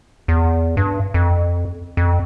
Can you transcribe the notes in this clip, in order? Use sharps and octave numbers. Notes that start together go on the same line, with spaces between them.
E2
G2
F2
F2